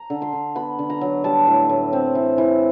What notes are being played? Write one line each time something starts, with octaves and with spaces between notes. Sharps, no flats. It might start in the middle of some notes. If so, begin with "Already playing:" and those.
Already playing: A#5
D3
C6
D3
B3 B5
D3
A#5
F#3
G3 A5
A2
A2
C4
E3
E3